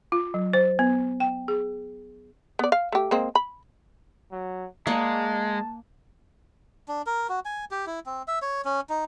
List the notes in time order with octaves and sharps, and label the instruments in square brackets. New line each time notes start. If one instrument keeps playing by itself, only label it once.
[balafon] F4
F#3
C5
B3
G5
G#4
[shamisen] B3 D5
F5
A3 G4
G#3 A#3 C4
B5
[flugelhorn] F#3
[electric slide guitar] G#3 [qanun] A#3 D5 F#5 [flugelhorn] A5
[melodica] D4
A#4
F#4
G#5
G4
E4
C4
E5
C#5
C#4
D#4